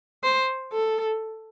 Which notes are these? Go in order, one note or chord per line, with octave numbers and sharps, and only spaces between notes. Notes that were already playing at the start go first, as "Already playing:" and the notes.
C5
A4